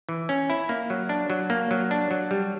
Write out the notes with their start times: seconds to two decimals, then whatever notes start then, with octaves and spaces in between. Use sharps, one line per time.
0.09 E3
0.29 C#4
0.50 E4
0.69 A#3
0.90 F#3
1.09 D4
1.30 F#3
1.50 A#3
1.71 F#3
1.91 D4
2.11 F#3
2.31 G3